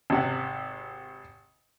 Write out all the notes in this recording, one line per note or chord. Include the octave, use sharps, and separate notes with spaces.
G#1 C3 F#5